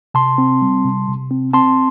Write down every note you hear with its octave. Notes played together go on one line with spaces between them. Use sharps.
C3 A5 C6
C4
G3
C3
C3
C4
C4 A5 C6